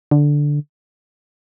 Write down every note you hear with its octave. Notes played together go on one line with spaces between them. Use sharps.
D3